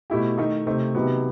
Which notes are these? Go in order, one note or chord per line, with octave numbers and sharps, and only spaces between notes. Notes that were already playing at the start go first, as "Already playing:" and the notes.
B2 A3 E4 G4
D#3 A3 D#4
C3 D#3 A3 C4
C3 D#3 F#3 B3